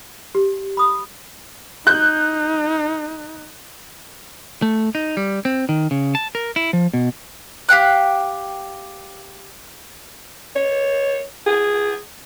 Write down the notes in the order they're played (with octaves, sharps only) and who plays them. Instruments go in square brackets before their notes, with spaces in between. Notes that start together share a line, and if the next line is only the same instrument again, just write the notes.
[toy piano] G4
B5 D#6
[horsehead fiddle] D#4 [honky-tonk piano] F#6 G6
[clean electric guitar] A3
D#4
G3
C4
D#3
C#3
A5
A#4
E4
F3
B2
[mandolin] G4 F5 G5 F#6
[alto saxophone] C#5
G#4